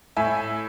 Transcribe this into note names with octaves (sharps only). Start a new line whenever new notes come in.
A2 E5 G#5